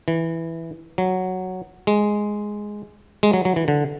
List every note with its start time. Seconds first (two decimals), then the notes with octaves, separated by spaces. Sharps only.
0.08 E3
0.98 F#3
1.87 G#3
3.23 G#3
3.33 F#3
3.45 F#3
3.56 E3
3.68 D3